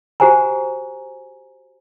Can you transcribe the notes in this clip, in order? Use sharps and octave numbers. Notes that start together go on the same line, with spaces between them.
F#4 G4 C5 G#5 A#5